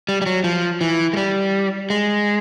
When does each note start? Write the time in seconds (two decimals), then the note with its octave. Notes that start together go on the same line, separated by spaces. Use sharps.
0.09 G3
0.22 G3
0.26 F#3
0.44 F3
0.81 E3
1.13 G#3
1.17 G3
1.90 G#3